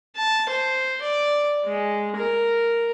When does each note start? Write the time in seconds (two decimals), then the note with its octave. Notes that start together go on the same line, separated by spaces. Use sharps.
0.16 A5
0.49 C5
1.02 D5
1.65 G#3
2.16 A#4